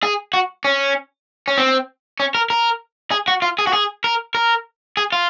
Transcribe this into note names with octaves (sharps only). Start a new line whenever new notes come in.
G#4
F#4
C#4
C#4
C4
C#4
A#4
A#4
G#4
F#4
F4
G#4
F#4
G#4
A#4
A#4
G#4
F4